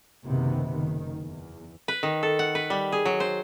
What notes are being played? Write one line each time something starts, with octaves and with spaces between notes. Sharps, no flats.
F#1 C3 D#3 B3
F#1 D#3
E2
B4
D#3
A4
F#5
B4
G3
G#4
F#3
C5